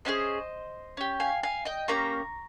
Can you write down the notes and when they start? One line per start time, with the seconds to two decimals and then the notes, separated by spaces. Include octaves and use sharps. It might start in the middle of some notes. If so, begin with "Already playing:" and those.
0.05 C#4 F4 G#4 C5 D#5
0.97 C#4 G4
1.20 F5 G#5
1.43 F5 G#5
1.65 D#5 G5
1.88 A#3 C#4 G4 A#5 C#6